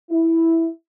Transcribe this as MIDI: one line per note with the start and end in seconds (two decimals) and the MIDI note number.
0.10 0.68 64